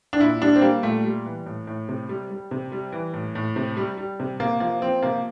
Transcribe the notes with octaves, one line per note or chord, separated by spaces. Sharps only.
D4
A#2 E4
G3 D4
C4
G3 A#3
A#2 A3
G3
E3
A2
A2
C3
G3
G3
C3
G3
E3
A2
A2
C3
G3
G3
C3
C3 A#3
F3 A#3
F3 C4
C3 A#3